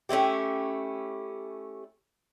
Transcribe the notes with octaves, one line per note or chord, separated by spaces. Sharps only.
A3 C#4 E4 G4